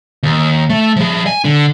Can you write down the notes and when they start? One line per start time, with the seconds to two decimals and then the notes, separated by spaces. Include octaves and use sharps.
0.23 D#2
0.70 A3
0.96 F3 G#4
1.27 G#5
1.45 D3